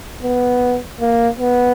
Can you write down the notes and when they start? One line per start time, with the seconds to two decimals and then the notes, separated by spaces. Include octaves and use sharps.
0.23 B3
1.01 A#3
1.40 B3